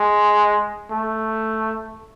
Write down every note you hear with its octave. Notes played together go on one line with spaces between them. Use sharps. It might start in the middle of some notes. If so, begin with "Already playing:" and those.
Already playing: G#3
A3